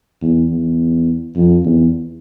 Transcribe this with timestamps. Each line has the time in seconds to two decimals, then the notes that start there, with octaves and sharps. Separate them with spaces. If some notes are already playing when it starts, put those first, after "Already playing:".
0.22 E2
0.50 E2
1.36 F2
1.65 E2